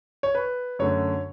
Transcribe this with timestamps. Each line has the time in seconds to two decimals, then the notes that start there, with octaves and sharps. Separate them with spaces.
0.23 C#5
0.35 B4
0.79 F#2 D3 A3 C#5